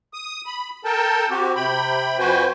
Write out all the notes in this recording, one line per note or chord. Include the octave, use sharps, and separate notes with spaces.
D#6
B5
A4 A#4 G5 A5
C4 F#4 G4
C3 G5 B5
F2 F#4 B4 C5 G5 G#5